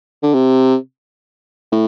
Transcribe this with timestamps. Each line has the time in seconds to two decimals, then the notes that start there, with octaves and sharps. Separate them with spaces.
0.23 D3
0.34 C3
1.72 A2